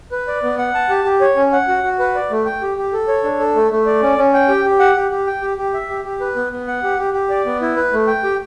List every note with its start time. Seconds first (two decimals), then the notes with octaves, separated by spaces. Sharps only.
0.12 B4
0.28 D5
0.43 B3
0.58 F#5
0.75 A5
0.89 G4
1.05 G4
1.21 C#5
1.36 C#4
1.52 F#5
1.68 F#4
1.83 F#4
1.99 B4
2.15 D5
2.30 A3
2.46 G5
2.62 G4
2.77 G4
2.93 A4
3.08 C#5
3.23 D4
3.39 A4
3.55 A3
3.71 A3
3.86 D5
4.02 C#4
4.18 C#4
4.34 G5
4.48 G4
4.64 G4
4.79 F#5
4.96 G4
5.11 G4
5.27 G5
5.42 G4
5.58 G4
5.74 E5
5.89 G4
6.05 G4
6.21 B4
6.36 B3
6.52 B3
6.67 F#5
6.83 G4
6.98 G4
7.14 G4
7.30 D5
7.46 B3
7.61 E4
7.76 B4
7.93 A3
8.07 G5
8.24 G4